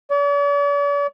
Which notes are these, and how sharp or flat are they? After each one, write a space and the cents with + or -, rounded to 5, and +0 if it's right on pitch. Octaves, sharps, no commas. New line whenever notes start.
D5 -45